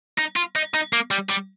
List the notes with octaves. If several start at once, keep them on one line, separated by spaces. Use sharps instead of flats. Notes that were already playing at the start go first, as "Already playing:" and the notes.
D#4
F4
D#4
D#4
A#3
G3
G3